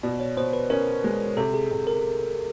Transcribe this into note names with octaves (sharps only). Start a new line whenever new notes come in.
B2 D5
C#5
B2 C5
B4
C#4 A#4
G#3
C3 A4
G#4
C3
A#4